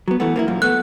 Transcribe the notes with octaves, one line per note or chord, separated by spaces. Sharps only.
F#3 B3
E3 A3 B3
A#3 B3 E4
F#2 A#2 F3
A3 B3 F#6